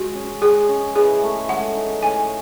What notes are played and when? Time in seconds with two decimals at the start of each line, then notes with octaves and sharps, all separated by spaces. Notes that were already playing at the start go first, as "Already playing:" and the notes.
Already playing: G#3 F#4
0.15 C#4
0.42 G#3 G#4
0.69 C#4
0.95 E3 G#4
1.23 A3
1.49 G#3 F#5
1.76 D#4
2.03 A2 G#5